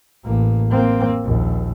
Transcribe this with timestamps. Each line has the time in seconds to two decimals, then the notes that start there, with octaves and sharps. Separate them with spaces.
0.25 A1 A#3
0.70 A#3 C4
1.24 A#1 D#2